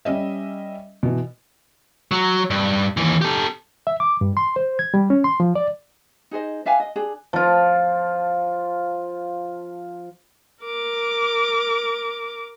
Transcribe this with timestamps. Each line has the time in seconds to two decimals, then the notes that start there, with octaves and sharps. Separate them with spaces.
0.05 G3 C#4 D#5 E5
1.03 B2 E3
2.11 F#3
2.50 G2
2.97 D#2 E3
3.21 G4 A4
3.87 E5
4.00 D6
4.21 G2
4.37 C6
4.56 C5
4.79 G#6
4.94 G3
5.10 C#4
5.24 C6
5.40 F3
5.55 D5
6.31 D#4 G#4 C5 D#5
6.66 D4 E5 F5 G#5
6.80 D#5
6.96 D4 G#4
7.33 F3 F4
10.63 A#4 D6